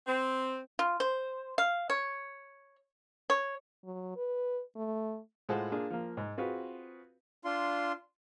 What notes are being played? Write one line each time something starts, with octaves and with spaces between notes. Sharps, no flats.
C4
F4
C5
F5
C#5
C#5
F#3
B4
A3
A2 G#3 F4 A4 C5 F#5
A#3 D4 F4 G#4
F3 A#3
G#2
C4 F4 F#4 G#4 B4
D4 F4 C6